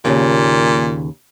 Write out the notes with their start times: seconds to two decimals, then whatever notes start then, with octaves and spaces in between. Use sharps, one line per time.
0.05 D#2 A#2 C#3